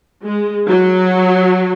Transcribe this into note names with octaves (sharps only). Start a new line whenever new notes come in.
G#3
F#3